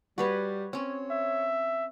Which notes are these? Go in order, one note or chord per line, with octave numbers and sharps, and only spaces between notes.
G3 F#4 B4 C#5
C4 C#4 C#5
E5